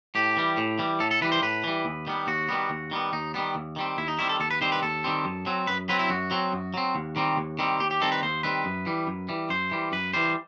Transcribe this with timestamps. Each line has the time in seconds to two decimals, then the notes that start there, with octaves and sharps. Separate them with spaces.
0.15 A2 G4
0.37 E3 G3
0.57 A2
0.79 E3 G3
1.00 A2 A4
1.11 A4
1.22 E3 G3 B4
1.32 C5
1.42 A2 B4
1.64 E3 G3
1.85 D#2
2.07 D#3 G3 B3
2.27 D#2 F#4
2.49 D#3 G3 B3
2.70 D#2
2.91 D#3 G3 B3
3.13 D#2 D#4
3.34 D#3 G3 B3
3.55 D#2
3.76 D#3 G3 C4
3.97 D#2 E4
4.08 D#4
4.19 D#3 G3 C4 E4
4.29 A4
4.40 D#2 A4
4.51 B4
4.61 D#3 G3 C4 C5
4.72 B4
4.82 D#2 A4
5.04 D#3 G3 C4
5.25 F#2
5.46 F#3 C4
5.67 F#2 B4
5.89 F#3 C4 B4
5.99 E4
6.10 F#2 F#4
6.31 F#3 C4
6.52 F#2
6.74 F#3 C4
6.95 D#2
7.16 D#3 G3 C4
7.37 D#2
7.59 D#3 G3 C4
7.80 D#2 G4
7.91 G4
8.01 D#3 G3 C4 A4
8.12 B4
8.23 D#2 C5
8.43 D#3 G3 C4 B4
8.65 F#2
8.86 E3 G3
9.07 F#2
9.29 E3 G3
9.50 F#2 C5
9.71 E3 G3
9.92 F#2 B4
10.13 E3 G3 C5